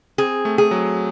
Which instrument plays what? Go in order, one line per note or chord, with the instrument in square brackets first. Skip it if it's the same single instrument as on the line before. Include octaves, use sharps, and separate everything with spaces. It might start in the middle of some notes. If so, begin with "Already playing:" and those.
[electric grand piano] C4 [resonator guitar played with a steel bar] G#4
[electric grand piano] A3
[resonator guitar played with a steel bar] G#4
[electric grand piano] F#3